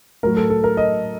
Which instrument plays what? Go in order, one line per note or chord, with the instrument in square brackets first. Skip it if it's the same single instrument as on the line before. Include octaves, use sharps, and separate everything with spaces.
[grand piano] A2 F#3 A#4
A4
A4
A#4
D#5